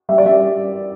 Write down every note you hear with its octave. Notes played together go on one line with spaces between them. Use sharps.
G3 E5
D5
G3 E5